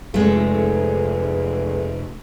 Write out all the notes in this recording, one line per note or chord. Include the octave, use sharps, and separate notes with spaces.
F1 E2 G#3 A3